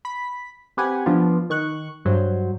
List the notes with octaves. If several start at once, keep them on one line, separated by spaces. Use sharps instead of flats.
B5 B6
C4 G4 B4 F#5 G#5
F3 B3 D4 F4
D#3 C#6 F#6
G2 F#3 C5